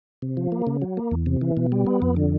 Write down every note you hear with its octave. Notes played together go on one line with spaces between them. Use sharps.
C3
F3
A#3
C#3
F#3
A#3
E2
C3
E3
B2
G3
B3
F2
D3